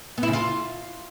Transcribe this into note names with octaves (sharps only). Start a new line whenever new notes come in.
B3
E4
C#3
F4